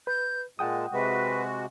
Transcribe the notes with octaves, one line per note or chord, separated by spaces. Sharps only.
B4 G6
A#2 G#3 F#5 G5 A5 D#6
C3 G#3 F#4 B4